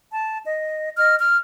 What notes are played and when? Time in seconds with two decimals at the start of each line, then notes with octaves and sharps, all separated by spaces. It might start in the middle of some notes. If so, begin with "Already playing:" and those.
0.11 A5
0.44 D#5
0.97 D#5 F6
1.19 F6